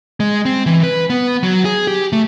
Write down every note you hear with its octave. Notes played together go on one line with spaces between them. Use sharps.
G#3
C4
E3
B4
B3
F#3
G#4
G4
A3